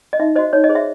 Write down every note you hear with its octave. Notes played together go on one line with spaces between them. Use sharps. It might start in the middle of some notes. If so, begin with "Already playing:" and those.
D#5
D#4 E5
F#4 C5 D#5
D#4 C#5
D#5
G#4 C5
E5